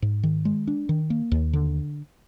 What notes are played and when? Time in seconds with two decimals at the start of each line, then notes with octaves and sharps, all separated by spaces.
0.02 G#2
0.23 D#3
0.45 G#3
0.67 D4
0.89 D#3
1.10 A#3
1.32 D#2
1.53 D3